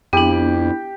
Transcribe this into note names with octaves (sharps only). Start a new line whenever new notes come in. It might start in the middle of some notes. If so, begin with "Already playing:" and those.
F2 B3 D4 E4 G4